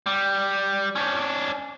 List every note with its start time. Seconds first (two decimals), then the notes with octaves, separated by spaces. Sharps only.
0.06 G3
0.96 C#4 D4